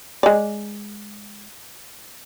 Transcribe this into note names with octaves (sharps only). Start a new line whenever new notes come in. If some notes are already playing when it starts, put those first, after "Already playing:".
G#3 D5